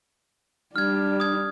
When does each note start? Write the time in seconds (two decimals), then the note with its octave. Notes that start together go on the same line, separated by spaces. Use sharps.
0.76 G3 D4 F6 G#6
1.20 D#6 G#6